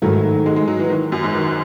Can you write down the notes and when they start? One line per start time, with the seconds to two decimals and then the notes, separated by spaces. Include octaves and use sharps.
0.02 G#2 D#3 F#3 A3 E4
0.46 G#3
0.56 G#3
0.68 F#3
0.80 E3
0.90 D#3
1.12 F#2
1.23 G#2
1.35 D#3